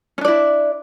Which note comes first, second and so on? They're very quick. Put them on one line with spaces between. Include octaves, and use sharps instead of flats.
C#4 D4 D5 E4